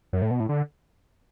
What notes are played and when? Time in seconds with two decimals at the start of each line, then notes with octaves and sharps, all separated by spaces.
0.13 F#2
0.22 A2
0.31 B2
0.40 A2
0.49 D3